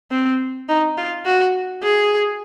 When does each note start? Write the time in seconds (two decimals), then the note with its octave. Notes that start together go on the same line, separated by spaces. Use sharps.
0.11 C4
0.69 D#4
0.98 F4
1.25 F#4
1.83 G#4